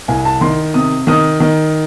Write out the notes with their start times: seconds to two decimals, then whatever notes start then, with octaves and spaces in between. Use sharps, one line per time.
0.08 C2 G#5
0.25 A5
0.41 D#3 C6
0.74 C3 D#6
1.07 D#3 D#6
1.40 D#3